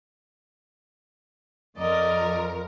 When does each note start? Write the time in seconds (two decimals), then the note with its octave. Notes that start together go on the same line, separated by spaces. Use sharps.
1.78 F2 A#4 D5 D#5